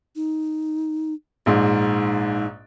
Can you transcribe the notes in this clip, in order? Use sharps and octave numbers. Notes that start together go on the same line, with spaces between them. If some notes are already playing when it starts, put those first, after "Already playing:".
D#4
A#1 G#2 D#4